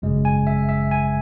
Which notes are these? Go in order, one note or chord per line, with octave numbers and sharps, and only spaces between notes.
G#1 F#2 C#3 G#3
G#5
E5
E5
G#5